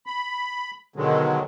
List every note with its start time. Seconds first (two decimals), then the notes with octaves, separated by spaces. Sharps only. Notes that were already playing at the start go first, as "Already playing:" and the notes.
0.06 B5
0.96 B2 D3 D#3 F#3 G#3